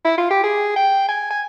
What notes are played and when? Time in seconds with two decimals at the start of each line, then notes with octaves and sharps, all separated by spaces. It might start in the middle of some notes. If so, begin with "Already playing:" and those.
0.05 E4
0.18 F4
0.30 G4
0.43 G#4
0.76 G5
1.09 G#5
1.30 G#5